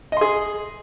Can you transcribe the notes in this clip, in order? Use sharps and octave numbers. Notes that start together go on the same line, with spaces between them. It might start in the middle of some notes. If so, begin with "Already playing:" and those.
G#4 D#5 C6